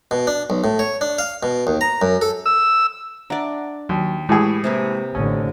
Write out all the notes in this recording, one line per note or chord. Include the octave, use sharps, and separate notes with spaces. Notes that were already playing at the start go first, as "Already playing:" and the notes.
B2
D4
B1
A2
C#5
D4
F5
B2
D#2
A#5
F#2
A4
E6
D4 D5 E5 F#5 A#5
D#2 F#3
A2 E3 G#3 G4 G#4
C3 A#3 B4
A1 D3 C#4 D#6